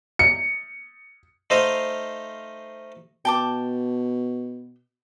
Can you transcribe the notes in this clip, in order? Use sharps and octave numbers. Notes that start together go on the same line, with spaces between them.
C#7
A3 D#4 C5 D#5 F5
B2 G5 A5 D6